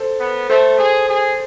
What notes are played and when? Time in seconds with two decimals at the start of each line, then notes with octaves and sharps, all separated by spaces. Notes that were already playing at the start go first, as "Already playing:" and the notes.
Already playing: A4 C5
0.20 B3
0.50 A3 A4 C5
0.78 G#4
1.08 G#4